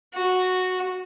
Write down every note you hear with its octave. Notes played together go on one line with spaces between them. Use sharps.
F#4